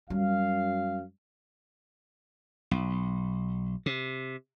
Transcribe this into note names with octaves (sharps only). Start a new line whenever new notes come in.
F#2 G3 F5
B1
C3